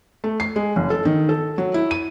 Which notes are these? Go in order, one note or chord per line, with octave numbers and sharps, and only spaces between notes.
A3
C7
G#3
F#1
A4
D#3
A4
F#3
E4
D#7